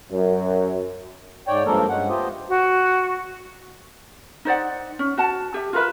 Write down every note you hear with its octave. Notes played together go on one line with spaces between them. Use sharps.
F#2
G#2 C#5 D5 G5
G2 F3 G#3 A#3 A4 A#4
G2 G#3 C#4 F#5
A3 B3 F4 G4 C5 D#5
F#4
D#4 C5 D5 F#5
C#4
F#4 F#5 A5
G4 E5
F4 A#4 B4 E5